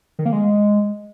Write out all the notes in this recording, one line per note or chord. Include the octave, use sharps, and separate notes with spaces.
D#3
A#3
G#3